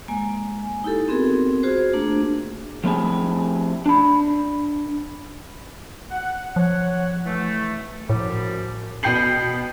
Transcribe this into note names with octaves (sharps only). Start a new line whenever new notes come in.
G#3 A#3 G#5
D#4 E4 G4 A4
B3 C4 F#4 G#4 A#4
F4 F#4 G#4 C5
A3 A#3 D4 G#4
F3 A3 C4 E4 G4 G#4
D4 B5
F#5
F3 C#5 F#5
E3 A3
F#2 A2 F3 G3
B2 B3 G5 G6 C7 F#7